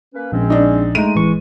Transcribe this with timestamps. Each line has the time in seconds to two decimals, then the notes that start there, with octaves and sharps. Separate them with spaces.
0.14 A#3 C#4 B4
0.32 A#1 G#3 C4 C#4
0.50 D4 D#4
0.95 G#3 A3 D#4 D#7
1.15 A1 E3 C#6